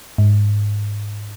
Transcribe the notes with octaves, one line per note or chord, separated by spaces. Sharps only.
G#2